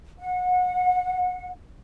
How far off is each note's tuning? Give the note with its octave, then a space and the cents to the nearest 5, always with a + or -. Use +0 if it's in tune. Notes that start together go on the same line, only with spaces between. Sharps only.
F#5 -30